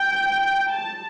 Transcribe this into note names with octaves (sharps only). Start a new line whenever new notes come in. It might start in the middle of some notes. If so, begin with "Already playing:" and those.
Already playing: G5
A5